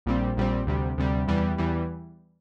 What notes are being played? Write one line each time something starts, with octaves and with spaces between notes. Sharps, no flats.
A#1 A#2 G3 C4
A#1 A#2 G3 C4
D2 C3 G3
D2 C3 G3
E2 E3 G3
E2 E3 G3